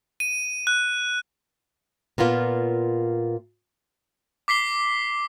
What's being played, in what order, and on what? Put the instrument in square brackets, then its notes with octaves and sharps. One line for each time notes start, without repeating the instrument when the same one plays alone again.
[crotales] D#7
F#6
[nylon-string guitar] A#2 A#3 B3 F4
[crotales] D6 B6 C7 G7